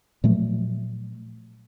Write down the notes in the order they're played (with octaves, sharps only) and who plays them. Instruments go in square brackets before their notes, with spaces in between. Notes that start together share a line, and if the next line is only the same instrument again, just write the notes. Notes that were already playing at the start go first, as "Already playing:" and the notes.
[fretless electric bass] A#2 F3 F#3 A3